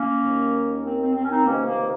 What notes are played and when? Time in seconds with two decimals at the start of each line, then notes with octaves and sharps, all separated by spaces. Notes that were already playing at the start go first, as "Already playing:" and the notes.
Already playing: A#3 C#4
0.24 D#2 D#3
0.84 C4
1.00 C4
1.14 C4
1.22 C#4
1.29 C4 D#4
1.45 C#2 C3 D#3 A#3 C#4
1.65 A#3